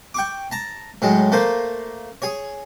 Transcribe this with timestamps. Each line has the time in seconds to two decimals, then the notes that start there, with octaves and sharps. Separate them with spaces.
0.14 G5 C#6 D6
0.52 A5 A#5
1.02 A2 F#3 G#3
1.32 A3 A#3 C5
2.22 G#4 C#5